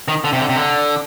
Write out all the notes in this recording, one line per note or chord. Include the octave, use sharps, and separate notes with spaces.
D#3
D3
C3
D3
C3
D3